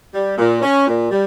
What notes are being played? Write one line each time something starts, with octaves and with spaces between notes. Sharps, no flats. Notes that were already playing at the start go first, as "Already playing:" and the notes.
G3
A#2
C#4
A#2
G3